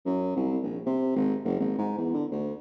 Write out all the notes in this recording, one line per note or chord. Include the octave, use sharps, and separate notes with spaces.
F#2
C2
A#1
C3
G#1
F#1
G#1
G#2
E2
D3
D2